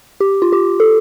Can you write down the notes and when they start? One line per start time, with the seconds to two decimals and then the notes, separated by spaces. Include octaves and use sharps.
0.20 G4
0.42 F4
0.52 G4
0.80 A4